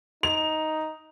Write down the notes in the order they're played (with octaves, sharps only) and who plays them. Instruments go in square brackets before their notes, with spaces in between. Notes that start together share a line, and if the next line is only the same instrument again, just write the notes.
[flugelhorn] D#4 [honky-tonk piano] F7